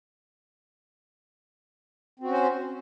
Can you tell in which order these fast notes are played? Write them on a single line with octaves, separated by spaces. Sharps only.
C4 F#4 C#4 C5